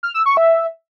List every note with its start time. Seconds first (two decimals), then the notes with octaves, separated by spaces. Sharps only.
0.03 F6
0.14 E6
0.26 C#6
0.37 E5